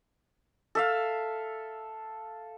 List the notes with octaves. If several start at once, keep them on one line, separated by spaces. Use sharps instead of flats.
A4 E5 F5